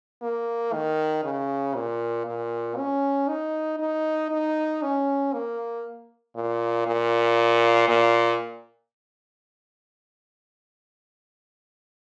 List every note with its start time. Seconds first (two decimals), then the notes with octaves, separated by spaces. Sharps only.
0.22 A#3
0.73 D#3
1.24 C#3
1.75 A#2
2.26 A#2
2.77 C#4
3.28 D#4
3.79 D#4
4.31 D#4
4.82 C#4
5.34 A#3
6.36 A#2
6.87 A#2
7.89 A#2